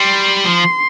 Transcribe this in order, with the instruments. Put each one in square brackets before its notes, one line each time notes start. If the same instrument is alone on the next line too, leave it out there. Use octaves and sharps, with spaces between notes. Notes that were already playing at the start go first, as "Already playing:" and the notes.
Already playing: [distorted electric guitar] G3 [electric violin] C6
[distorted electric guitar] F3 [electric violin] C6